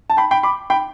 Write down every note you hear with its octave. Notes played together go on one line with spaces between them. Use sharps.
A5
G5 B5
G5 B5
B5 D6
G5 B5